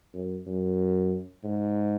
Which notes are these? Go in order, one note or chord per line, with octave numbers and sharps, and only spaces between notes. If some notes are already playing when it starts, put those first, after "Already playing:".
F#2
F#2
G#2